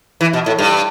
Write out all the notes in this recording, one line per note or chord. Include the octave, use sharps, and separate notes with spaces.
E3
B2
A2
G2